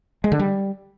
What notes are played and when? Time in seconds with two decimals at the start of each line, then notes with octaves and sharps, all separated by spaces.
0.24 G#3
0.32 D3
0.39 G3